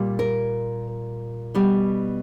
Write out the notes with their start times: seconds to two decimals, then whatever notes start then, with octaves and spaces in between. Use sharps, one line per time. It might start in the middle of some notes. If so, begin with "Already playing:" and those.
Already playing: A#2 G3
0.19 A#4
1.55 B2 G3